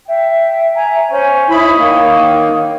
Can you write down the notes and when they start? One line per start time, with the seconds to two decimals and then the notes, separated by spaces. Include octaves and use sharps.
0.07 E5 G5
0.75 E5 G#5 A#5
1.08 C#4 C5 C#5
1.50 D#4 E4 C#5 B5
1.78 D#3 A#3